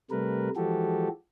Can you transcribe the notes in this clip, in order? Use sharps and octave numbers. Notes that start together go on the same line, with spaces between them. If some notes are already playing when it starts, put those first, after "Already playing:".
C3 G3 A3 A#4 B4
E3 F3 G#3 F#4 G4 A4